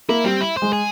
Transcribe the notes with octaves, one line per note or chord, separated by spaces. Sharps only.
A#3 E4
G3 C4
E4
G#3 C5
G#4